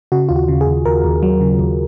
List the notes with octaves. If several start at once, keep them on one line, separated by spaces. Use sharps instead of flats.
C#3 F#4
D#2 F4
F#4
C#3
G#4
D#2
D#2 A#4
D#2
F#3
C#3
D#2